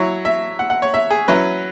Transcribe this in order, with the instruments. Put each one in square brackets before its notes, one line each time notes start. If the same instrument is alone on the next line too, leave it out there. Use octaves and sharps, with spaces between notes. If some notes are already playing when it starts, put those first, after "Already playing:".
Already playing: [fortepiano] F#3 E4 C#5
E5
F#5
F#5
C#5
E5
G#4
F#3 C#4 E4 B4